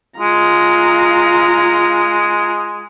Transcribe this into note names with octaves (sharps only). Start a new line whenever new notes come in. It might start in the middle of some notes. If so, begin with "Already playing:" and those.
G#3 F4 A#5